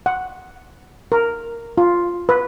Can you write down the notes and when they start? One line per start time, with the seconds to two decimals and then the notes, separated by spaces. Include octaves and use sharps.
0.06 F#5
1.12 A#4
1.78 F4
2.29 B4